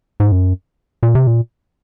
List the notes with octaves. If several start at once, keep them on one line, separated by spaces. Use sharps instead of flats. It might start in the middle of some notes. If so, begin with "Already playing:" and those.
G#2
F#2
A#2
C3
A#2